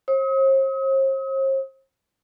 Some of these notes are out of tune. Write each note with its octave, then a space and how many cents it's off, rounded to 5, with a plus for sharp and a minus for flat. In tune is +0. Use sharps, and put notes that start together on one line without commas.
C5 +45 D#6 +40